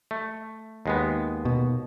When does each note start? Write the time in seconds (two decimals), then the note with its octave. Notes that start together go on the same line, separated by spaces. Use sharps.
0.11 A3
0.86 D#2 G#3 B3
1.45 B2